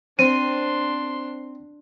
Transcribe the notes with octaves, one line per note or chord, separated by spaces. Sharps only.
C4 D4 C6 D#7